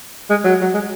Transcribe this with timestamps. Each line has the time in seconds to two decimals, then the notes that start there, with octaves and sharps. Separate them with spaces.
0.30 G#3
0.45 F#3
0.61 F#3
0.74 G#3